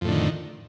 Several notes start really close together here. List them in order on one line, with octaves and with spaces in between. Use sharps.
F2 A2 D3 D#3